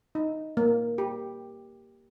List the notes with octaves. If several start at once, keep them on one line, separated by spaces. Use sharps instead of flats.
D#4
A#3
G4